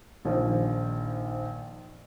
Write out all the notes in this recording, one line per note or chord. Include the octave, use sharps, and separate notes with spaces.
A#1 D#3 F3